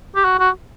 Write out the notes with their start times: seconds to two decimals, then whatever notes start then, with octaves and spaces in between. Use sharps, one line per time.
0.15 G4
0.25 F#4
0.39 F#4